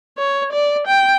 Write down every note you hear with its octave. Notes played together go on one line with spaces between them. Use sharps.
C#5
D5
G5